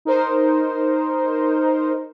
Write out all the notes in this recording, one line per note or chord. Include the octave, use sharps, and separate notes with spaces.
D#4 A#4 C5